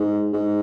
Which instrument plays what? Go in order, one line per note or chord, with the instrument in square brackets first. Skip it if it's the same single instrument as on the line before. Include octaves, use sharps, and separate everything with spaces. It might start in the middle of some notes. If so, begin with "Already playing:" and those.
Already playing: [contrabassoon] G#2
G#2